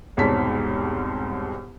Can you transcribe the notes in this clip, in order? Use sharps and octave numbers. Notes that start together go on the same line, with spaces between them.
E1 C2 G#2 C#5 A5 B6